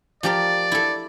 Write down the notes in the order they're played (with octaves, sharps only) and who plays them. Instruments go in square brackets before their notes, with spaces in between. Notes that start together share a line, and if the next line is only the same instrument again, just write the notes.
[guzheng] F3 G4 A#4 [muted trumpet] D5
[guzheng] E4 A4